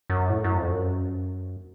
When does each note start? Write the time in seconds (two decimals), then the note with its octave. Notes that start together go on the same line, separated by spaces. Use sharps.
0.10 F#2
0.30 A2
0.44 F#2
0.58 F2
0.72 F#2